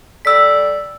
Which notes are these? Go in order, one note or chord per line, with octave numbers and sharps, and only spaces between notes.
G3 A4 D5 E6 B6